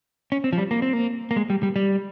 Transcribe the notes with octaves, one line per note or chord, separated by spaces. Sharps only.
C#4
C4
F3
G3
A#3
C4
A#3
A#3
G#3
G3
G3
G3